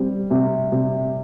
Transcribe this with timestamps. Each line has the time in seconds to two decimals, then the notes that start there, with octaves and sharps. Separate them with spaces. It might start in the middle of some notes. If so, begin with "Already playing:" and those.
Already playing: G3 C4
0.30 C3
0.72 C3